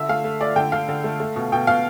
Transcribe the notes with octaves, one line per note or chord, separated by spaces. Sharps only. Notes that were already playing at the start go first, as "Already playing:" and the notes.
Already playing: D3 E5
A3 F5
A3
A3 D5
D3 G5
D3 F5
D3
A3
A3
B2
B2 G5
B2 F5